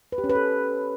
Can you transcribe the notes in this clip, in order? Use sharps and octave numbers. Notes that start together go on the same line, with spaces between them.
B4
G4
C#4
B4
A4